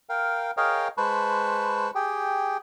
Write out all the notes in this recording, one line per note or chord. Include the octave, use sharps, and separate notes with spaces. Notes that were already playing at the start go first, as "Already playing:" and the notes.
A#4 F5 G5
G#4 A#4 C#5 D#5 F5 G5
G#3 B4 C5 A5 B5 C#6
G4 G#4 G5